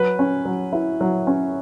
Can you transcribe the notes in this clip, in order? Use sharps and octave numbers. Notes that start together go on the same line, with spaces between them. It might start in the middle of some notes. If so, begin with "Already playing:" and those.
Already playing: F#3 B4
C#4
F#3
E4
F#3
C#4